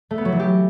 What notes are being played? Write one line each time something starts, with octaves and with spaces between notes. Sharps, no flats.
A3
B3
F#3
E3
G4